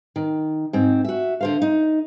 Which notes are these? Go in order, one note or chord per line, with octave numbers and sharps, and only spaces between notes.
D#3
G#2 C4
F#4 E5
D3 C5 F5
D#4